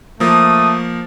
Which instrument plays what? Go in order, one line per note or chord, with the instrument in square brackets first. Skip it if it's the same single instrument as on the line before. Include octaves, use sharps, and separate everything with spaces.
[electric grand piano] F3 A#3 [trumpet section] A3 D#6